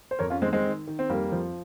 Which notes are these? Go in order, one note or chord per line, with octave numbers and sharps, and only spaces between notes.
C5
F2 A#4 C#5
C#4 F4
D#3 G#3 C4
G#3 C4
D#3
D#3
C4
F2 G3 A#3
F3